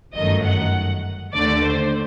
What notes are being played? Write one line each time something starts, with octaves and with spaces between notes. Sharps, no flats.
G1 F#2 D#3 A3 D#5
F#5
D#2 D3 A3 D5
C5